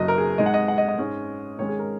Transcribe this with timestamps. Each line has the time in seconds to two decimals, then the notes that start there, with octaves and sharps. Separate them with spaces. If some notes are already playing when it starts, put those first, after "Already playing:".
Already playing: F#1 F#2 F#3 D#5
0.08 A#4
0.18 G#4
0.38 G#2 G#3 D#4 D#5
0.46 F#5
0.54 D#5
0.68 F#5
0.78 D#5
0.88 D#5
0.99 G#2 G#3 C#4
1.58 G#2 D#3 G#3 C#4 C#5
1.69 G#4
1.79 A#4